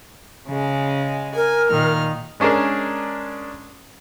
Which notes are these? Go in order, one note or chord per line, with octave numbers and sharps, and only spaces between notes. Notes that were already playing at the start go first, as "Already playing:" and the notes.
C#3 G#3
A#4 G#5
A#2 D#3 F6
G#3 C#4 D4 G#4 A#4